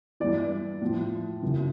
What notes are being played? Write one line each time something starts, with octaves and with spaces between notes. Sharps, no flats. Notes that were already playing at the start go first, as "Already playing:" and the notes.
G2 E3 D5
A2 F3
F#2 C#3 E3